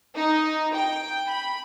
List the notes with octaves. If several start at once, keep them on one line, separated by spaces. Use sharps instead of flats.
D#4
G5
B5